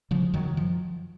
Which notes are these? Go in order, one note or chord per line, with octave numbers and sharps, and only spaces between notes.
C#3 F3
F#2 D#3 F#3
F3